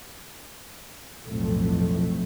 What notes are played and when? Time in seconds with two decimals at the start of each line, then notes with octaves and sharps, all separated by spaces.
1.24 B1 F2 A2 A3